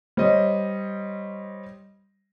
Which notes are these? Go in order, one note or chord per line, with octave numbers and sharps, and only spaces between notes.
G3 C5 C#5 D#5